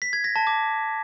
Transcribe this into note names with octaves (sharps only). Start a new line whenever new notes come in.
B6
G#6
A#6
A5
D6